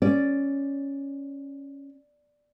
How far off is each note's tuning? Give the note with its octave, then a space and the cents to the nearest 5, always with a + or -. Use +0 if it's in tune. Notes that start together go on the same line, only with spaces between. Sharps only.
C#4 +0 D5 +0